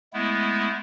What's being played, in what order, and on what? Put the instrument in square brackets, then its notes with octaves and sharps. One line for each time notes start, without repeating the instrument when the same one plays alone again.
[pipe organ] G#3 A3 B3 E4